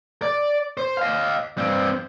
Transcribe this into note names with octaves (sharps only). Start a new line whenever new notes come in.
D5
C5
D#5 F5
G2 C4